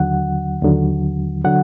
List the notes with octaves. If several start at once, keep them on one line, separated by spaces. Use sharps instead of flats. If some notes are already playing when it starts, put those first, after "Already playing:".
Already playing: D#2 D3 F#3 F#5
D#2 D3 F#3
D3 F#3 F#5